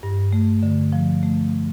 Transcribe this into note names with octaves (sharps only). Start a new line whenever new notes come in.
G2
A3
D3
F3
A3